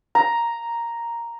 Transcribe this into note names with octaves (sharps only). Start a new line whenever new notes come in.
A#5